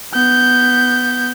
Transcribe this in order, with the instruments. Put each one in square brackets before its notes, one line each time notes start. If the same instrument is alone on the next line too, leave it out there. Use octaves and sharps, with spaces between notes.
[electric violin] B3 G6